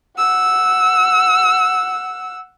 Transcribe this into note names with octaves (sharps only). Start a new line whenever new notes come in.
F#5 E6